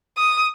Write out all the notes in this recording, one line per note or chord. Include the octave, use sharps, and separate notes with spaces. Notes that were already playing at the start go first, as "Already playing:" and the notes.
D#6